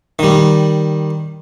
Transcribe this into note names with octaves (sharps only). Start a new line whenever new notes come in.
D#3 G3